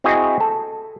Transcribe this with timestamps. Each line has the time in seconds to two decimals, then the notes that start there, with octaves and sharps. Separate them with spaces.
0.04 C4 E4 F#4 G#4 D#5
0.40 A4